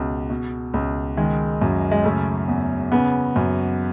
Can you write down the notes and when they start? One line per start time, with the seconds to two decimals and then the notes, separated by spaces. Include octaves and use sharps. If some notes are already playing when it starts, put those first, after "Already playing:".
Already playing: C#2 B2
0.30 B2
0.74 C#2
1.17 D#3 G#3
1.62 F#2
1.91 G#3
2.04 C#3 A3
2.48 E2
2.92 C#3 B3
3.36 F#2